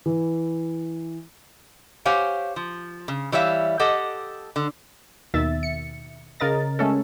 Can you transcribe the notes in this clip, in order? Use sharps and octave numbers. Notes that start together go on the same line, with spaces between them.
E3
G4 C5 C#5 F5 F#5 G#5
F3
C#3
E3 G3 C#5 E5 F5
G4 A4 D#5 F#5
D3
D#2 B2 D#3 E5 A6
C#7
C#3 A#4 D#5 A6
G#3 A3 C#4 A4